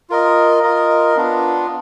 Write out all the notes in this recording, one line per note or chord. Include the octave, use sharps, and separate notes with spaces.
F4 A#4 D#5
F4 A#4 D#5
B3 D4 F4